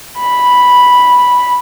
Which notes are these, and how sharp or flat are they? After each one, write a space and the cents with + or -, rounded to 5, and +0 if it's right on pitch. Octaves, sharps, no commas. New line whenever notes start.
B5 -5